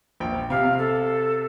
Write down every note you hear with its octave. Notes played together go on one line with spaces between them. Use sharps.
A#1 G5
C3 F5
A4